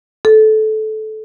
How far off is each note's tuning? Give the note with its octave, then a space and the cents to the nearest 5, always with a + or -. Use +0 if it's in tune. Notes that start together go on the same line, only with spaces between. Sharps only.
A4 -20